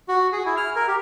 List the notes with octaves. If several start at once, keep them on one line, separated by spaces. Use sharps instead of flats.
F#4
G#4
E4
F6
A#4
G4